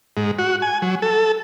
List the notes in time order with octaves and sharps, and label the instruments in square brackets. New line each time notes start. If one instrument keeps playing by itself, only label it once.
[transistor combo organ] G#2
F#4
G#5
F#3
A4